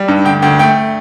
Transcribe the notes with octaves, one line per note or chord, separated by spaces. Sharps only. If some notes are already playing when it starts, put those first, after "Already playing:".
Already playing: G3
G2
D2 G5
D2 G5
A3 G5